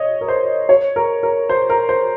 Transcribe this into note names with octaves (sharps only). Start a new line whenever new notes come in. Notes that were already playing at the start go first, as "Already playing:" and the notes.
Already playing: C#5 D#5
A#4
C5
C#5
A#4
A#4
C5
A#4
C5